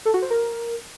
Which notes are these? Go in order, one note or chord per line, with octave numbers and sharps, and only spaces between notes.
A4
F#4
C5
A#4